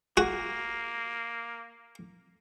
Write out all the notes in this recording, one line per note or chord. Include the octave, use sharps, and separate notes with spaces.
A#3 F#4